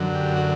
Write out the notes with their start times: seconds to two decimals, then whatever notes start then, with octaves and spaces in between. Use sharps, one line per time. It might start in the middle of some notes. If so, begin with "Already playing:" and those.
Already playing: F#2 D3 F#3
0.14 G4
0.36 F#4